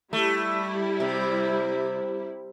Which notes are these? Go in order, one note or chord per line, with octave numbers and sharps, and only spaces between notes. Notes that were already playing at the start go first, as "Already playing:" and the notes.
G3 A3 E4
C3